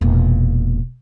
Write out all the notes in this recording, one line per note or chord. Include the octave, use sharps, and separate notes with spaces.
E1 A#2